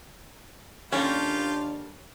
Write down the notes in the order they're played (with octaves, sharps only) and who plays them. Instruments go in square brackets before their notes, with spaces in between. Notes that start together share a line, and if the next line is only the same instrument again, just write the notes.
[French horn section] D#2 D4 [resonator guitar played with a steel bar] G3 A#3 A4 [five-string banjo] C#4 [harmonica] F4 G4